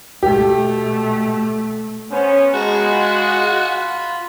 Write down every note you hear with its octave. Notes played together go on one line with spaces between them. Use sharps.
B2 A3 G4
B3 C#4 C5
G#3 B3 F#4 A5 A#5
F4 B5